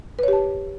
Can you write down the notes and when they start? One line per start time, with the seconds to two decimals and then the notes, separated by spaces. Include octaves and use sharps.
0.19 B4
0.23 C#5
0.28 G4
0.33 A5